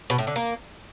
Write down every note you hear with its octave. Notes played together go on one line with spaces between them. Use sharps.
B2
A2
D3
A#3